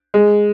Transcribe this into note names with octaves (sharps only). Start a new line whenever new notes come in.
G#3